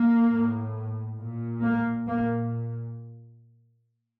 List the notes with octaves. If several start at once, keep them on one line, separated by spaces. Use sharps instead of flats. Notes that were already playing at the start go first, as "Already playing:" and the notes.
Already playing: A#3
A2
A#2
A#3
A#2 A#3